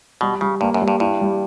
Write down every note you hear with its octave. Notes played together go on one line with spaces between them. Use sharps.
B2 G3
C#3 G3
G2 A#3
F#2
G3
G2
G2 E4
G3